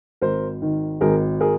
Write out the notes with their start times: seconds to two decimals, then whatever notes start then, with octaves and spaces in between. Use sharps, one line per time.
0.21 G#1 A#4 C5
0.62 D#3
1.01 G#1 G#4 A#4
1.40 G#4 A#4